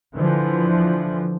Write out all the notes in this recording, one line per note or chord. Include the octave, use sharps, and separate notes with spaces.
D3 E3 F3